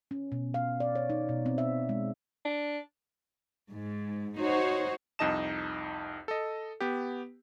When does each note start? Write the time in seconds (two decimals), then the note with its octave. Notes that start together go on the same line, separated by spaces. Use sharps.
0.11 C#4
0.32 B2
0.54 F5
0.80 D5
0.95 C#5
1.10 D#4
1.29 B2
1.46 C4
1.58 E5
1.89 G#3
2.45 D4
3.71 G#2
4.39 D#4 F#4 C5 C#5
5.19 C2 F2 D#4 D#5 A5 E7
6.28 A4 D#5
6.80 B3 G4